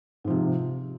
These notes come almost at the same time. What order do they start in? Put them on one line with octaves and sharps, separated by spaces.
G#2 F3 C3